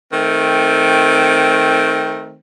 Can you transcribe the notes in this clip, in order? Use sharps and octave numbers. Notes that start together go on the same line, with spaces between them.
D#3 A3 C4